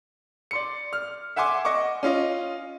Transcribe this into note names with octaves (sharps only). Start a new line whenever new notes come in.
D5 C6 C#7
F6
E5 F#5 G#5 C6 D6
D#5 F#5 C#6 D6
C#4 F4 D#5